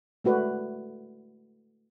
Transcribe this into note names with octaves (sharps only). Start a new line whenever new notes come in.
G#3 A3 F#4 B4 D5